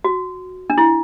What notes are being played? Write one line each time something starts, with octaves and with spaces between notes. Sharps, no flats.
F#4
D4
E4